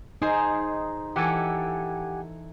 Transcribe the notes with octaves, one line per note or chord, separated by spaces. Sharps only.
D#4 G#4 C5
E3 G4 A4 F#5 G#5